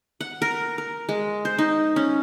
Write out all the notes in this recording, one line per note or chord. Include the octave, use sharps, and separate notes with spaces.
F#5
A#4
A#4
G#3
C5
D#4
C#4